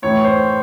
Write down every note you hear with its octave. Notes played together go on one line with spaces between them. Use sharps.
A2 E3 C#5
C5